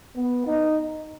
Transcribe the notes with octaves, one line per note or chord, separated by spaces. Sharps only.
B3
D#4